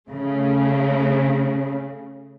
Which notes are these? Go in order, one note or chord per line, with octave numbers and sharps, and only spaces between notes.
C#3 A3